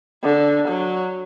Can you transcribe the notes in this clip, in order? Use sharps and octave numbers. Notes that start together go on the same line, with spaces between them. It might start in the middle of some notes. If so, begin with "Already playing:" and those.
D3
F#3